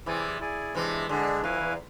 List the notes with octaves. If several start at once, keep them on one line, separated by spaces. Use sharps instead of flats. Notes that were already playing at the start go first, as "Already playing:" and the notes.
C3 E3 E4 G#4 D5 G#5
E4 G#4 D5 G#5
C3 E3 G#3 D4 G#4
D3 G#3 D4 G#4
F2 E4 B4 F5 G#5
E2